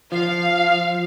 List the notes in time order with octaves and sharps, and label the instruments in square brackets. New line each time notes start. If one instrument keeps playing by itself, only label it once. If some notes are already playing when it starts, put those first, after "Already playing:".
[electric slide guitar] F3 [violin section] F5